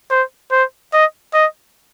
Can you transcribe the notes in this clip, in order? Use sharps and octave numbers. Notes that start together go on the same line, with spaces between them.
C5
C5
D#5
D#5